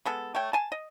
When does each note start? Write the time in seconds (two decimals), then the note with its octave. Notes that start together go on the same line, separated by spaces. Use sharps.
0.05 G#3 B3 A4
0.35 A3 C#5 G5
0.53 G#5 A5
0.72 D#5